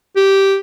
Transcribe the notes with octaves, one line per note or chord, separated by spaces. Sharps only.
G4